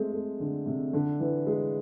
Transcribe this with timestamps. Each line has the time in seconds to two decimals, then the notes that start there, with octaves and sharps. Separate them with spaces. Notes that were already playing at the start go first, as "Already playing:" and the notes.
Already playing: G#3 A3 C4
0.13 A3
0.40 D3
0.66 C3
0.93 D3
1.20 E3
1.47 G#3